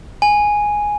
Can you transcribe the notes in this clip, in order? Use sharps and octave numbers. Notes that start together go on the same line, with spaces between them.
G#5